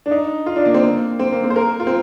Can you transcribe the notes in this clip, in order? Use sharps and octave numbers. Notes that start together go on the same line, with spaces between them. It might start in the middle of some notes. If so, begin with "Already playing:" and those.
D4
D#4
F4
D4
A#3
C4
A#3
C4
A#3
C4
C5
A#4
F4
C4